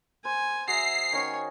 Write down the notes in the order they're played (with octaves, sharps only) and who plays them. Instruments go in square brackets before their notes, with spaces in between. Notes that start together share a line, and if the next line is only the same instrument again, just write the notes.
[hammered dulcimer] C5 [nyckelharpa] G#5
[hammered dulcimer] F#4 G#4 [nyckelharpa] E5 A#5 [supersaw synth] C7
[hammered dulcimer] D#3 C#4 D#5 [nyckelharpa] C#5